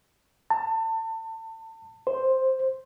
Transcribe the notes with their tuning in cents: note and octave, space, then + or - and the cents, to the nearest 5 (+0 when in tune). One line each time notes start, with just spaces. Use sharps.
A5 +30
C5 +5